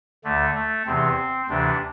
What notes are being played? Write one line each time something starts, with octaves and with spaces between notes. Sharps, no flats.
D2 D3 A3
A3
E2 C3 E3 C4
D2 C3 E3 D4